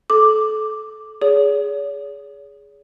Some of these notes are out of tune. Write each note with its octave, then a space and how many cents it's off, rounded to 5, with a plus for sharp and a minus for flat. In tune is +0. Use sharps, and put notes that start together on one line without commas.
A4 -25 D6 +0
G#4 +0 C#5 +45